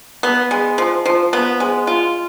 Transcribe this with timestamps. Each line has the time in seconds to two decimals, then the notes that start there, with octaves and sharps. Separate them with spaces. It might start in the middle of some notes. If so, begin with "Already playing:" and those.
0.23 B3
0.51 G#3
0.78 F3
1.06 F3
1.33 B3
1.60 G#3
1.87 F4